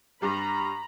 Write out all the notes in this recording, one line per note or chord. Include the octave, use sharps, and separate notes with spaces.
G2 G3 A#5 B5